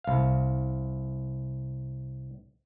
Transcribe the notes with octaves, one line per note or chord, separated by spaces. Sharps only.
C2 F5